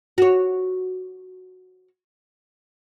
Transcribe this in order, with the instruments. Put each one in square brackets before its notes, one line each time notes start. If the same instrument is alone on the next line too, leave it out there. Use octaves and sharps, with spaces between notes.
[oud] F#4 C#5